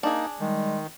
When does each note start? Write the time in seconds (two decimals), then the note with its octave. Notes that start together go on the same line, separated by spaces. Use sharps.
0.03 A#3 D4 D#4 G#4
0.40 D#3 G3 G#3